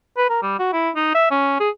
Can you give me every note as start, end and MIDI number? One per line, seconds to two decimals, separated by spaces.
0.17 0.27 71
0.30 0.41 70
0.42 0.57 55
0.59 0.71 66
0.73 0.90 64
0.96 1.14 63
1.14 1.27 76
1.31 1.57 61
1.60 1.70 68